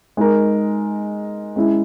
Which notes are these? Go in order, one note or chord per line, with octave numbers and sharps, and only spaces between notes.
G#3 D#4 A#4
G#3 C#4 E4